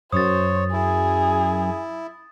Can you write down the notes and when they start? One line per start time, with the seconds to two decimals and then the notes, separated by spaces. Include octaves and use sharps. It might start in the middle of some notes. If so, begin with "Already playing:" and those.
0.12 F#2 C5 C#5 D#6 A6
0.73 E4 G#4